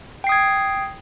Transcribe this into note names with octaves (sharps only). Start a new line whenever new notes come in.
G5 D#6 G#6 C7